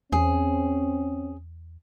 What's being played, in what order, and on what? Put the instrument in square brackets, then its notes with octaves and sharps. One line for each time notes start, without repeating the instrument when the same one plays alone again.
[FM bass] E2 [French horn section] C4 C#4 [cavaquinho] G#4